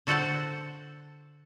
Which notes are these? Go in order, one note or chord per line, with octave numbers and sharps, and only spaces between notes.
D3 F#4 A4 C5 F#5 A5